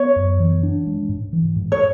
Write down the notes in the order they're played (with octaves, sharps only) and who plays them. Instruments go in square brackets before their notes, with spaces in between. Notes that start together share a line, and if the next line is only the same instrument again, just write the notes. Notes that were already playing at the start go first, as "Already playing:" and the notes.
Already playing: [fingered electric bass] B3 [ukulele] C#5
[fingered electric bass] F#2
E3
D4
G#3
G#2
E3
G#2
[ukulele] C#5